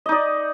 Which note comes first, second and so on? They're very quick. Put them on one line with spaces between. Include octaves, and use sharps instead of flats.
D#5 D#4 D5